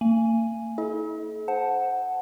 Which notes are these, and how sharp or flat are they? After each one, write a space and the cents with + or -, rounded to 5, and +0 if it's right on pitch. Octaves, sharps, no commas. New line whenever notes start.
A#3 -45 G#5 +0
E4 -45 A4 -45 D#5 +40
C5 +0 F#5 +0 A5 +0